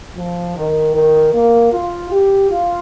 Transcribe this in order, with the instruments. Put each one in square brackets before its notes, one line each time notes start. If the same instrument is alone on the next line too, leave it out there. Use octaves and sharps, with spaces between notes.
[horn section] F3
D#3
D#3
A#3
F4
G4
F4